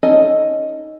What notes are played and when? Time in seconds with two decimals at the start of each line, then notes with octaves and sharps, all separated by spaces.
0.03 C#4 D#4 A4 D#5 G#5